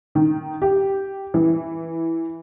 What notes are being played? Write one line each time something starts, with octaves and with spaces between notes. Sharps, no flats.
D#3
G4
E3